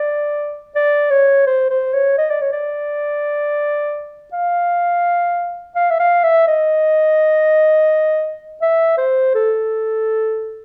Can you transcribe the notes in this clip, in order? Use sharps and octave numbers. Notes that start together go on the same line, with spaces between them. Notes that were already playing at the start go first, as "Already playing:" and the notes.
Already playing: D5
D5
C#5
C5
C5
C#5
D#5
D5
C#5
D5
F5
F5
E5
F5
E5
D#5
E5
C5
A4